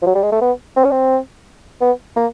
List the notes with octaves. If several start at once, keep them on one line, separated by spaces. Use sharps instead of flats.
F3
F#3
G3
G#3
A3
B3
C4
C#4
C4
B3
A#3